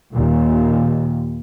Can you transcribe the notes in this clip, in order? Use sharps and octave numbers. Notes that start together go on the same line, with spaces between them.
D#2 A#2